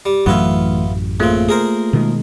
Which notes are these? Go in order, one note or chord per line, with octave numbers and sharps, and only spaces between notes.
G3
A1 F#2 E3 F#3 A3 B3 F4 E5
C#3 A3 A#3 C4 F4
G#4 A#4 C5
B2 D#3 G#3